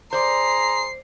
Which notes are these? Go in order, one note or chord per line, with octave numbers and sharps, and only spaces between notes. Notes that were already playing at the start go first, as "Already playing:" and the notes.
G#4 C5 D5 A#5 C6 C7